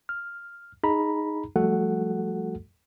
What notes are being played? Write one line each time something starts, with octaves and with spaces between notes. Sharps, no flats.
F6
D#4 G#4 A#5 B5
F3 G3 A3 F#4 A4 F#5